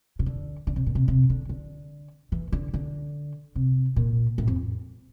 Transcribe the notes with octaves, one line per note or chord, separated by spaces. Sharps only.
C3
D3
D3
C3
A#2
C3
C3
D3
D3
E3
D3
D3
C3
A#2
A2
F2